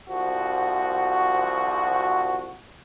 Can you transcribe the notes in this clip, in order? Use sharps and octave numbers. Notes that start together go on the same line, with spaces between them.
C2 F3 F#4